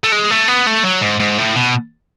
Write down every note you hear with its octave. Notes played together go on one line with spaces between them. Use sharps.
A3
G#3
A3
B3
A3
F#3
G#2
G#2
A2
B2